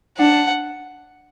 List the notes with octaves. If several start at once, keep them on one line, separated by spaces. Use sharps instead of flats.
D4 F#5